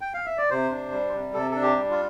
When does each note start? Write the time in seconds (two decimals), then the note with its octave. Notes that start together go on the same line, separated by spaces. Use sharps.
0.01 G5
0.14 F5
0.26 E5
0.38 D5
0.50 C3 C5
0.71 D4
0.92 G3
1.13 C3
1.34 C3 A4
1.51 D4 A4
1.62 G4
1.77 G3
1.90 F4